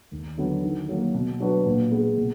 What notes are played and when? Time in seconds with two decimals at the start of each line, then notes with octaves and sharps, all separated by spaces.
0.11 D#2
0.38 D3 F#3 B3
0.63 D#3
0.89 F#3 A#3
1.15 B2
1.40 F#3 D4 F#4 B4
1.66 A#2
1.91 G#3 B3
2.18 B2